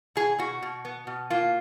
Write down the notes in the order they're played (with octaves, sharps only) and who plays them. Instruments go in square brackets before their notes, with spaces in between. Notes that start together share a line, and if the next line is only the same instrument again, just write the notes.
[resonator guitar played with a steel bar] B2 G#4
B2 F#4
B2
B3
B2
A#3 F4